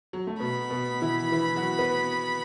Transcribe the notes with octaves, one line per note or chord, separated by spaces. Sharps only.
F#3
A3
B2 B3 B5
B2 B3
E3 E4
E3 E4
F#3 F#4
B3 B4